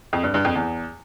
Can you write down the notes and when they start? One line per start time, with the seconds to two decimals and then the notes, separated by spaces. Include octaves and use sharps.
0.13 F2
0.23 G2
0.34 G2
0.45 F2
0.55 E2